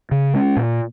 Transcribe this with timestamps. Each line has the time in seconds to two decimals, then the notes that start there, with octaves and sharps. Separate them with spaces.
0.11 C#3
0.34 G#3 C#4
0.57 A#2